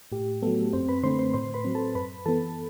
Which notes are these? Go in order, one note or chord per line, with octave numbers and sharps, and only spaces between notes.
A2 G4
F#3 A3 B3 A4
F#2 C4 C5
B4 B5
D3 A3 C4 C5 C6
C5 C6
A2 C5 C6
B4 B5
F#3 C4
A4 A5
F#2 B4 B5
E3 B3 A4 A5